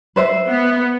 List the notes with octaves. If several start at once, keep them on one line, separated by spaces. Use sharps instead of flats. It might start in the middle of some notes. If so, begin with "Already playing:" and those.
B4 C5 E5
B3